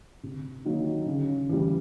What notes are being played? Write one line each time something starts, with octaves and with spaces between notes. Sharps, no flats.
C3
D#3 F#3 A#3 D#4
C#3
E3 G3